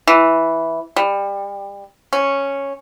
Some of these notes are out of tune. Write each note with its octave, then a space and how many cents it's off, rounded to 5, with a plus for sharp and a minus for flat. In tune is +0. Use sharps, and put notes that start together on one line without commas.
E3 -5
G3 +25
C#4 -5